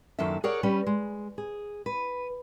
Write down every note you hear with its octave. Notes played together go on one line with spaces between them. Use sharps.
F#2 D#3 F#3 A#3 A4 E5
G#4 A#4 C#5 D5 F#5
G3 C#4 B4
G#3
G#4
B4